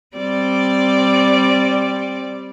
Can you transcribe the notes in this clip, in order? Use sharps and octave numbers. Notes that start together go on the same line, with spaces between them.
G3 C4 D5